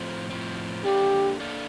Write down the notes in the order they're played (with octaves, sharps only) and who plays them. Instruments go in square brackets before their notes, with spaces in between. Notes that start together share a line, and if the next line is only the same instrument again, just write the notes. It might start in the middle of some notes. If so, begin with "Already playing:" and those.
Already playing: [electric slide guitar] A2 F3 C4
A2 F3 C4
[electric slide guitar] A#3 D4 A4 D5 F5 [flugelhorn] G4
[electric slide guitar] A#3 D4 A4 D5 F5